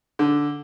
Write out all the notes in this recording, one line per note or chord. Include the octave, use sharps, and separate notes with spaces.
D3